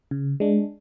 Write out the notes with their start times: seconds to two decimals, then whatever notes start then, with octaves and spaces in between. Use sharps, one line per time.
0.11 C#3
0.40 G#3 D4